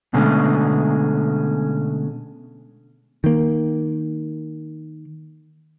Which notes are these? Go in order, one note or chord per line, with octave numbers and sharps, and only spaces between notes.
B2 D3 G#3 A3 C#4
D#3 A#3